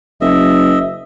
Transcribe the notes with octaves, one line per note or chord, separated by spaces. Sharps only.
F#1 D#5 E5